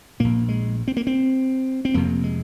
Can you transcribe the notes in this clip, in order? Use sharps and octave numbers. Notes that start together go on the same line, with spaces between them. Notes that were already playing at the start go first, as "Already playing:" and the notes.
A#1 A#2 A#3
G#3
C4
A#3
C4
C4
F1 F2 C3 A#3
G#3